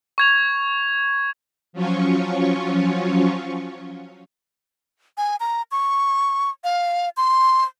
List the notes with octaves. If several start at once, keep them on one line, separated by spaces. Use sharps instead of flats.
C#6 G#6 F7
F3 F#3 C#4 F4 C#5
G#5
A#5
C#6
F5
C6